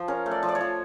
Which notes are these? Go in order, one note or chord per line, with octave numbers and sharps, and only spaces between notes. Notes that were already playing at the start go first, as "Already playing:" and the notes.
Already playing: F3
C#4 A#4
A3
D5
F3
D5
C#5
F3